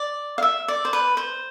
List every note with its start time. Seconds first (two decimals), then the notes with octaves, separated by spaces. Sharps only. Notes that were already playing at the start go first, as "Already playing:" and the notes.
Already playing: D5
0.38 F5
0.42 E5
0.68 D5
0.85 C5
0.93 B4
1.17 C5